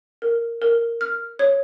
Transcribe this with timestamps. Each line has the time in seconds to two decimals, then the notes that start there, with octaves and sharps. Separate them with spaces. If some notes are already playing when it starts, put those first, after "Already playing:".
0.22 A#4
0.62 A#4
1.01 F6
1.39 C#5